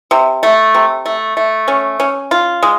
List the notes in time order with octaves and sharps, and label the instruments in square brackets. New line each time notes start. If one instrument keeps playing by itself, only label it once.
[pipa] C3
A3
C3
A3
A3
C#4
C#4
F4
G#3